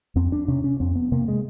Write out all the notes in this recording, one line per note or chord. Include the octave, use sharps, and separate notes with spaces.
F2 C4
D4
C3 C#4
C#4
F2 C4
B3
C3 A#3
G#3